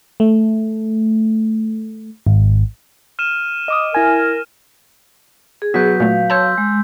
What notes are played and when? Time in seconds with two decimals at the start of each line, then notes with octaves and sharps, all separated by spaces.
0.20 A3
2.27 G#1
3.19 F6 D#7 E7
3.68 D#5 D6 D#6
3.94 E4 A#4 G#5
5.62 G#4
5.74 F#3 B3 F#4 G6 B6
6.00 A#2 A3 F5
6.30 C#5 A5 C6 E6 G6
6.58 G#3